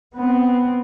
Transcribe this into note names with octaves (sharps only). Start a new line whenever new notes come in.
B3 C4